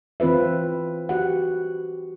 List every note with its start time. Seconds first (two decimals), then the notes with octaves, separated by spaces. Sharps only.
0.20 E3 C4 F4 B4 E5
1.09 F#4 G4 F#5